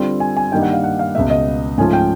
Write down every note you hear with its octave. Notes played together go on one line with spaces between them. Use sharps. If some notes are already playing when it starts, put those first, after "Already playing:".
Already playing: D3 G3 C4 F4
G#5
G#5
G2 D#3 G3 A#3 D#4 G5
F#5
F5
F#5
F5
C#2 B2 G#3 E5
D#5
G#2 F3 A3 C#4 F4 G#5
G5